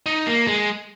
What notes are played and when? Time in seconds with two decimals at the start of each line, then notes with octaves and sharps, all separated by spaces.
0.06 D#4
0.27 A#3
0.47 G#3